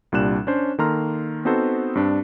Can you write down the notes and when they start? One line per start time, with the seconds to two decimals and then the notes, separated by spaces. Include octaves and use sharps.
0.12 C2 A#2 G3 D4 F#6 E7
0.47 C#4 D4 C5
0.79 D#3 A#3 A4 A#5 C6 F6
1.45 B3 C4 D#4 F#4 A4 C5
1.95 G2 C4 D4